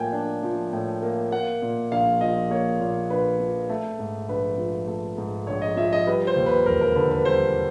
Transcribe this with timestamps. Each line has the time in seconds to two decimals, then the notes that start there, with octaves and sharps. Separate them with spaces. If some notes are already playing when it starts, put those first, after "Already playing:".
Already playing: A2 F3 A#3 G5 G#5
0.13 D4
0.43 F3
0.73 A2
1.02 A#3
1.31 A#3 F#5
1.62 A#2
1.92 A#1 F5
2.21 F3 D#5
2.51 A#3 C#5
2.80 A#2
3.10 A#1 B4
3.39 F3
3.69 A3
3.99 G#2
4.28 A#1 B4
4.58 F3
4.88 A3
5.18 G#2
5.47 A#1 C#5
5.62 D#5
5.76 F3 E5
5.92 D#5
6.06 G3 B4
6.27 C5
6.36 D#2
6.46 B4
6.66 E1 A#4
6.81 A#4
6.95 D3 B4
7.11 B4
7.25 G3 C5